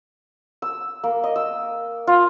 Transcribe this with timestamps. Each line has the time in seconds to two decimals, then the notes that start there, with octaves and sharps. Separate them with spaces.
0.62 E6
1.03 A#3
1.24 D#5
1.36 E6
2.07 F4